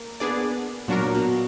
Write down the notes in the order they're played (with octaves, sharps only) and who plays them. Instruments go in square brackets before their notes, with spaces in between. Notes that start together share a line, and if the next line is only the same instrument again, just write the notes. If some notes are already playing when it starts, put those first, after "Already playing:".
Already playing: [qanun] A#3
[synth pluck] B3 D4 G#4 D5
[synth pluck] A#2 F#3 D4 F#4 A#4 [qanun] B3
[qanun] A#3
B2 B3